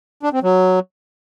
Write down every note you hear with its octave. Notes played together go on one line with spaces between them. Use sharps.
D4
C4
F#3